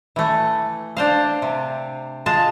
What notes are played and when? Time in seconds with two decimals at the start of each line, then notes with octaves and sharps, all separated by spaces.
0.16 E3 A3
0.97 D4 C5 F5
1.42 C3
2.26 G#3 F4 A5